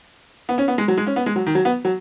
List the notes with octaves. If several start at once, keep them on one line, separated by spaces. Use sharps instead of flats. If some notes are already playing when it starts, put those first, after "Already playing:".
B3
C#4
B3
G#3
F#3
G#3
C#4
B3
G#3
F#3
D#3
F#3
B3
F#3